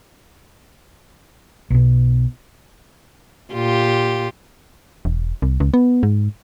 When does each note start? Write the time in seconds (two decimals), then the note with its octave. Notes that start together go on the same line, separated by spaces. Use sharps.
1.70 B1 B2
3.53 A#2 F4 G4
5.05 E1
5.42 C2
5.60 C#2
5.74 B3
6.03 G#2